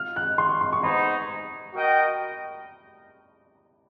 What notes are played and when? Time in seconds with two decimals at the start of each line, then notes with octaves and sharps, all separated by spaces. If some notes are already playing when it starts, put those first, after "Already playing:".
Already playing: F4 F6
0.16 F#6
0.38 C6
0.49 C#6
0.61 C6
0.73 C#6
0.83 G#3 B3 D#4 G#4 C5 B5
1.74 F#4 A#4 D#5 G5